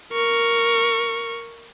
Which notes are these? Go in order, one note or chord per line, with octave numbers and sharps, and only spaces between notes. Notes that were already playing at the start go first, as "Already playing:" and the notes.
A#4 C#6